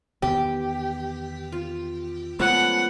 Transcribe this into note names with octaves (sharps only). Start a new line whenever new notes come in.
E2 D#3 B3 G4
F4
F3 G#3 A3 B3 C#4 F#5